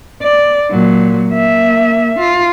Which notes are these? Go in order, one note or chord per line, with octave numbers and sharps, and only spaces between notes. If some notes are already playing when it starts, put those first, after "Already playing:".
D5
A#2 F#3
A#3 E5
F4